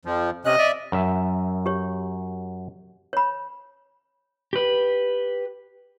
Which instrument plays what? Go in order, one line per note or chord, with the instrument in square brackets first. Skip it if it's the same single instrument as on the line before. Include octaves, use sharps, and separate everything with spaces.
[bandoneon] F2 F3
[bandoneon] C3 C#4 F#6 [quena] D#5
[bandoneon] D5 E5
[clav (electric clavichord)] F#2 E5
[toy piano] G4 C#5
C#5 B5
[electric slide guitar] G4 B4